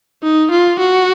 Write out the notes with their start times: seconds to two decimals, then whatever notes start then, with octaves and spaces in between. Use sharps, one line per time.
0.23 D#4
0.51 F4
0.79 F#4